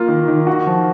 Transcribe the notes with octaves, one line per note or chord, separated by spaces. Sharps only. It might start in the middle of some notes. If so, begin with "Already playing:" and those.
Already playing: A#3 F4
D#3
D#3
F#4
F3